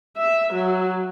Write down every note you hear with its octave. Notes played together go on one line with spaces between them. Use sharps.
E5
F#3